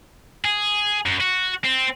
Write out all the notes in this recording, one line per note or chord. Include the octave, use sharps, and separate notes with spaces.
G#4
F#2
F#4
C4